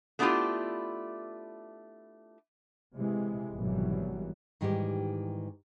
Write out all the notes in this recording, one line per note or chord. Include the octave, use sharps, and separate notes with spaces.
A3 B3 D4 E4 F4 G4
C3 E3 G#3
G#1 F#2 B2 E3 F#3 G3
G#2 D#3 E3 G3 D#4 G4